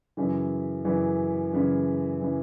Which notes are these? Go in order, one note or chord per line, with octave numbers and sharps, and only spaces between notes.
F#2 C#3 E3
F#2 C#3 E3
F#2 C#3 E3
C#3 E3